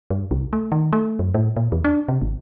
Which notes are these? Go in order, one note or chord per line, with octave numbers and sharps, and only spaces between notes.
G2
C2
A3
D#3
A3
F#2
A2
A#2
E2
D4
C3
G#1